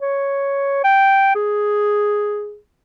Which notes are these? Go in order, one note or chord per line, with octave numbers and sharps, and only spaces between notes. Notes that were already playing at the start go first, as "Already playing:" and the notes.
C#5
G5
G#4